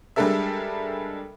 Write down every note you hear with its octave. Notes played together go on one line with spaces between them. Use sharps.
G3 G#3 D4 A4 A#4 E5